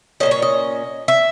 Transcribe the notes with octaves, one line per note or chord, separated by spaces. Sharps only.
A#3 C#4 D#5
A#2
C#5
D#5
E5